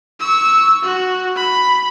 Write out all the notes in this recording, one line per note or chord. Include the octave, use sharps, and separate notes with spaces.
C#6 E6
F#4
B5